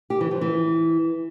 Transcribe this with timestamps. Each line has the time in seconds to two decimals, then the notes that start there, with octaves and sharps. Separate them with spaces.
0.10 G4
0.21 E3
0.31 F3
0.41 E3